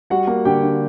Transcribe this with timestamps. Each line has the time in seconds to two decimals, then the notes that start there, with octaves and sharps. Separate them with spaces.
0.10 G3 F#4 F#5
0.27 A#3
0.45 D3 G4 G5
0.63 D4